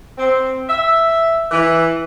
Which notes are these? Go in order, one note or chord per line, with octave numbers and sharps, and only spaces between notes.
C4
E5
E3